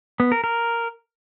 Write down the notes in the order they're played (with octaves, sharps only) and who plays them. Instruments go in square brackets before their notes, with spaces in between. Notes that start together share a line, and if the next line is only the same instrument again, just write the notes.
[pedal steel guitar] B3
A#4
A#4